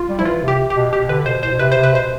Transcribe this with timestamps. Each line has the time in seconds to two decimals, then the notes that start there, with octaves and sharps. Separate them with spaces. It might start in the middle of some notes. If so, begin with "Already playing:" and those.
Already playing: F4
0.09 G3
0.19 F3 E4
0.25 E3 F4
0.43 C3
0.48 G4
0.70 B2 G4
0.92 B2 G4
1.09 D3 B4
1.26 B2 C5
1.43 A2 C5
1.52 B2
1.59 C3 B4
1.72 C3 C5
1.83 B4
1.94 B2 C5